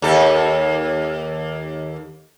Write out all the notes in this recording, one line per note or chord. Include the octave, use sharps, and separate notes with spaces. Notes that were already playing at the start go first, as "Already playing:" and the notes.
D#2 A4